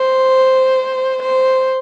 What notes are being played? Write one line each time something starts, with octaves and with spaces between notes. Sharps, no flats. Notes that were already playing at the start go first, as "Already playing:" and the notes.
Already playing: C5
C5